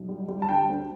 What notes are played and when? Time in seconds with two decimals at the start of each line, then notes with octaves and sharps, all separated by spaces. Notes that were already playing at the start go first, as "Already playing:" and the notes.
Already playing: B1
0.09 G3
0.28 G3
0.42 A5
0.49 D3 G5
0.69 D2